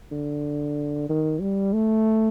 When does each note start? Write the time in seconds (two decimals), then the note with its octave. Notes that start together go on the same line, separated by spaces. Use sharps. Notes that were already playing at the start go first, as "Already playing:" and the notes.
0.12 D3
1.09 D#3
1.41 G3
1.74 A3